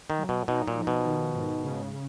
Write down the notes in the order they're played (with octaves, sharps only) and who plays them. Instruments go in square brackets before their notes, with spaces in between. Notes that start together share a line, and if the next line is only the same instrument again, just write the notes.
[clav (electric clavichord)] D#3
[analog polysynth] F#3
[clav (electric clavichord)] B2
[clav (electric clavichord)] B2 [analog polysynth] D#4
[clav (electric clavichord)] A#2
[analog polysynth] F3
[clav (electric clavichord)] B2
[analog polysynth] D#3
G#2
C#3
C#3